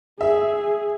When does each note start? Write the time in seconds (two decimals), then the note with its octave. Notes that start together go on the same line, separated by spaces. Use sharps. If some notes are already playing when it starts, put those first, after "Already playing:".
0.21 G#4 E5